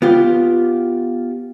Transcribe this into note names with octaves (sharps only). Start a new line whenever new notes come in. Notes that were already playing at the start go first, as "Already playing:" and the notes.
B3 F4 G4